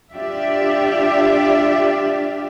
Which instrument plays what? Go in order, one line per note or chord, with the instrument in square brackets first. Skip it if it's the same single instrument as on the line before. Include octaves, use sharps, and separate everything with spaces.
[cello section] D4 F4 G4 D5 E5